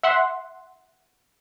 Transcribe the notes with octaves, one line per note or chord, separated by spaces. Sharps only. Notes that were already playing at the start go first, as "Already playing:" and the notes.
E5 F#5 C6